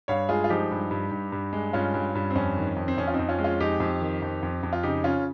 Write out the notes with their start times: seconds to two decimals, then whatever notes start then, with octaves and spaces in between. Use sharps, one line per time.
0.08 G2 C#5 F5
0.29 G#3 F4 G#4
0.44 F4
0.49 F3 D#4 G4
0.71 G2
0.91 G2
1.11 G2
1.32 G2
1.53 G#3
1.73 G2 C#4 F4
1.94 G2
2.15 G2
2.31 C4
2.35 F2 C#4
2.57 D#3
2.77 F2
2.88 C4
2.98 F2 C#4
3.08 F4
3.14 C4 D#4
3.19 F2
3.29 C#4 F4
3.39 G#3
3.44 C#4 F4
3.60 F2 D#4 G4
3.80 F2
4.01 D#3
4.22 F2
4.43 F2
4.63 F2
4.73 F4
4.83 C#3 D#4 G4
5.04 C#3 C#4 F4